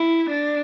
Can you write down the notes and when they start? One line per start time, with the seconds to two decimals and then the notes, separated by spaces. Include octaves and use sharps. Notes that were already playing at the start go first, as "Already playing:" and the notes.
Already playing: E4
0.29 D4